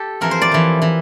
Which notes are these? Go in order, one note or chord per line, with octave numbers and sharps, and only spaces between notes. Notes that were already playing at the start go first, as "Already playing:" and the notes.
Already playing: G4 A4
F2 E3 A#4
C5
D5
F2 E3
E3